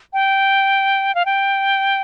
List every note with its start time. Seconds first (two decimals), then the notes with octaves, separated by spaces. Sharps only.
0.13 G5
1.15 F5
1.26 G5